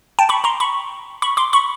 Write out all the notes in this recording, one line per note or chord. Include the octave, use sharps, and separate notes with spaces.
G5 A5
B5 C#6
A#5 C6
B5 C#6
B5 C#6
C6 D6
B5 C#6